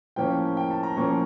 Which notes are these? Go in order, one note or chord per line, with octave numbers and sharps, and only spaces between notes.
A2 F3 A#3 C#4 G5
G5
A5
A#5
A2 F3 A#3 C#4 C#6